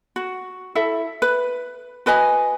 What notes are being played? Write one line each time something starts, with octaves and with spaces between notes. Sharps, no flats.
F#4
E4 A4 E5
B4
F#4 B4 D#5 G#5